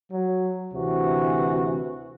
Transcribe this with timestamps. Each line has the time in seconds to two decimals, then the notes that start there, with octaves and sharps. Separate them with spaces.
0.12 F#3
0.73 D2 C3 E3 F#4